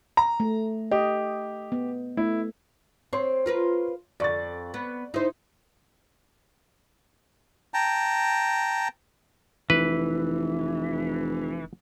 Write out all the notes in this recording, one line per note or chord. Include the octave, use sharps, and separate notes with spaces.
A#5
A3
G4 D#5
B3
A3 E4
C4 C#5 C6
F4 A#4 B4
F2 D5 C#6 A6
B3
D#4 E4 C5
G5 A5 A#5
F1 E3 B4